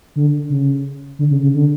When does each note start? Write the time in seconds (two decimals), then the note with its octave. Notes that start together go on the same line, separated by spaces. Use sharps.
0.16 D3
0.50 C#3
1.19 D3
1.31 C#3
1.43 C#3
1.54 D3